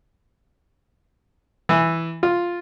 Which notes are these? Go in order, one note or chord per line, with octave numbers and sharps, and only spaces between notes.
E3
F4